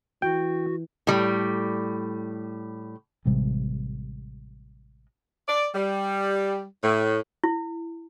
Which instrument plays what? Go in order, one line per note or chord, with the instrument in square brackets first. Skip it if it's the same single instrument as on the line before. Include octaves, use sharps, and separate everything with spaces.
[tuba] E3 [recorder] F#4 [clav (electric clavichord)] G5
[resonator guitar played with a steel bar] A2 G3
[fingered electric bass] A1 C3 G3 G#3
[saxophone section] D5
G3
A2
[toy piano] E4